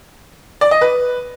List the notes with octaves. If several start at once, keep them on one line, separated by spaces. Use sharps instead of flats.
D5
D#5
B4